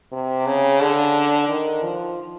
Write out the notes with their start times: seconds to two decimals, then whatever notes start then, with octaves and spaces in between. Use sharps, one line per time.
0.12 C3
0.47 C#3
0.80 D3
1.49 D#3
1.83 F3